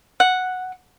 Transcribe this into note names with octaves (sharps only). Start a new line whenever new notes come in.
F#5